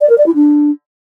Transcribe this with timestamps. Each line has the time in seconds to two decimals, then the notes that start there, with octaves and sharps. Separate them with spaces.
0.01 D5
0.09 A#4
0.18 D5
0.26 E4
0.35 D4